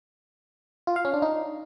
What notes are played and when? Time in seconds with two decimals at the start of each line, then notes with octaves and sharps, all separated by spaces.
0.87 F4
0.96 F5
1.05 C#4
1.14 D4
1.22 D#4